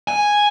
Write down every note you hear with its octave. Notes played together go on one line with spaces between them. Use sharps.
G#5